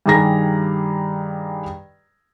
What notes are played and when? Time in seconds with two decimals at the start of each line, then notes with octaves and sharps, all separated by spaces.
0.06 G2 D#3 G4 G#4 A#5 A#6